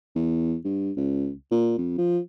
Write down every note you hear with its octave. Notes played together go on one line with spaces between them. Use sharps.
E2
G2
C#2
A#2
F2
F3